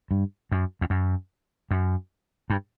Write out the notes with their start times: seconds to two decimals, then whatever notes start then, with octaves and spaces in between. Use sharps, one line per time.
0.11 G2
0.52 F#2
0.81 E2
0.90 F#2
1.71 F#2
2.50 G2